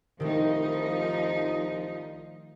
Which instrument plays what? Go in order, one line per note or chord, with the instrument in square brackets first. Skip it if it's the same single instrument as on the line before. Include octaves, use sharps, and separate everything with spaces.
[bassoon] C2 [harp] D#3 A3 [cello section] F3 D#4